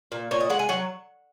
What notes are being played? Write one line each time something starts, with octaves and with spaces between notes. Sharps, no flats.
A#2
A#2 C#5
D#5
G#3 F#5
G#5
F#3 F#5